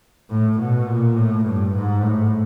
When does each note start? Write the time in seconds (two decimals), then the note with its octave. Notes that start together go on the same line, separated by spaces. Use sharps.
0.30 A2
0.59 B2
0.87 A#2
1.17 A2
1.46 G2
1.75 G#2
2.03 A2